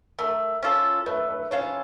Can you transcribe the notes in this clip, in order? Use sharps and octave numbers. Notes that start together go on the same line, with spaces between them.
A3 A#4
C#4 F4 A4
A3 B4
B4
C#4 F4 A4 C#5